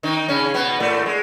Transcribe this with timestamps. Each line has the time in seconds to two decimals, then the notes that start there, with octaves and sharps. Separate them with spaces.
0.03 D#3 D#4
0.28 C#3 C#4
0.54 B2 B3
0.80 A2 A3
1.06 G#3